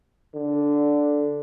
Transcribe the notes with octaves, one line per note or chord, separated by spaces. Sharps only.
D3